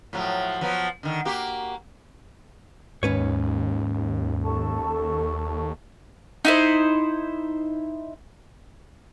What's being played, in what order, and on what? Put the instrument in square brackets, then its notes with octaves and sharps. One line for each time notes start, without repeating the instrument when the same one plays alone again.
[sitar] A2 F3 F#3
F3 F#3 B3
D3 D#3
A#3 F#4 G4
[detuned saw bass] D#2 [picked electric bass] G#2 [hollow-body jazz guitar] C#4 B4 C#5
[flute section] A4 A5 C#6
[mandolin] D#4 E4 C5